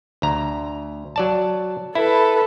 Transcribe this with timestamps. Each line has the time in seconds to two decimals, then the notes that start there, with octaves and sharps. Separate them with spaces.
0.22 D2 A#5
1.16 F#3 D5 A5
1.95 E4 A4 B4